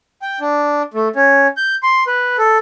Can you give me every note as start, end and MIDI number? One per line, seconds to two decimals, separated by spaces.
0.22 0.39 79
0.40 0.82 62
0.94 1.08 57
1.16 1.47 61
1.57 1.75 91
1.83 2.03 84
2.07 2.37 71
2.38 2.58 69